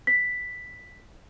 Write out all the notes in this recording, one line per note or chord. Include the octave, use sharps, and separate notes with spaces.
B6